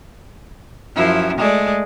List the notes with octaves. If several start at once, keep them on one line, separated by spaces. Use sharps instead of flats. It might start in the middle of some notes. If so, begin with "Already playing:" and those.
F#2 F3 E4
G#3 A3 D5